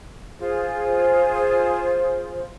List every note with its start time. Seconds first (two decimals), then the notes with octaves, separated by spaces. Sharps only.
0.39 F4 G#4 C5